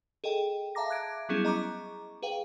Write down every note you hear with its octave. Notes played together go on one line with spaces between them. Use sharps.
G#4 A4 D#5 G5
E5 F5 A5 A#5 D6 A#6
D6 F#6 G#6 D7
F#3 G3 B3 C#4 E4 G#4
D#5 A#5 C#6 D6
G#4 B4 F5 G5